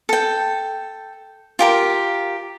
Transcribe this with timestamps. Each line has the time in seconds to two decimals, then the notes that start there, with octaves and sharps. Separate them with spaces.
0.09 A4 G5
1.59 F4 G4 A#4